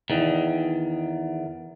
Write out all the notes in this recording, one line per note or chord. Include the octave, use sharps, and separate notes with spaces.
E2 D#3